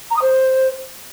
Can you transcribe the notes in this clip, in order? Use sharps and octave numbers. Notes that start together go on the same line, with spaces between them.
A#5
D#6
C5